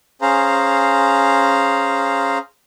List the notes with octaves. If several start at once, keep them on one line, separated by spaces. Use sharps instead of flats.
C#4 G#4 C5 F5 A#5